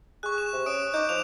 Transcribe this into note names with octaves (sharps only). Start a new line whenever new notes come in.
G#4 C#6 F#6
E7
C3
C#4 D#6 D7
D#4 C#6 D6 G6
F3 F7